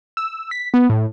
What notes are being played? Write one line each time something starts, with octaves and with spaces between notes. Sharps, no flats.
E6
B6
B3
A2